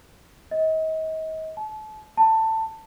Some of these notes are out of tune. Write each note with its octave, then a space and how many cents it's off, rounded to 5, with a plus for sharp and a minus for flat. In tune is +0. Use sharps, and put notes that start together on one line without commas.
D#5 +35
A5 -35
A5 +15